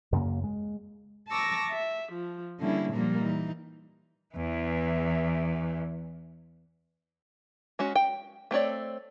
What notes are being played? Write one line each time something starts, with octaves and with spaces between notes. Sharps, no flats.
F#2 C#3 A#3
G#3
A5 A#5 C#6 D6 E6 A#6
E5
F3
D3 G3 A#3 C#4 D4 E4
A#2 F3 G3 A#3 A#4
E3 D#4
E2 E3
G#3 C#4 F#4
G5
A3 C4 C#5 D5